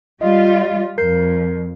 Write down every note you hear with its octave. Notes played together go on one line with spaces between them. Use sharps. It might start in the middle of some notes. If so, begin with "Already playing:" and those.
G3 F4 D#5
F2 A#4 G6 C7